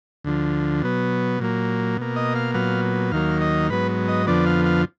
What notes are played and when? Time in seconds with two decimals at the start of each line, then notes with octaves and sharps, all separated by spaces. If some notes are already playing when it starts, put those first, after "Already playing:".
0.24 D2 D3 F3
0.83 B2 F#3 B3
1.40 A#2 F#3 A#3
1.97 B2 A#3
2.16 D#5
2.35 F5
2.54 A#2 F#3 B3 F5
3.12 D#2 D#3 F#3 A#3 F5
3.41 D#5
3.70 G#2 F#3 B3 B4
4.08 D#5
4.27 F2 D3 F3 B3 D5
4.46 F5
4.65 F5